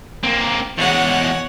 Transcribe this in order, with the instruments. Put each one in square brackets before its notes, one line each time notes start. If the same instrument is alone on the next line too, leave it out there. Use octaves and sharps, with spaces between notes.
[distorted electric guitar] A#3 C4
[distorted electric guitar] E2 G#3 [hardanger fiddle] C#5 F#5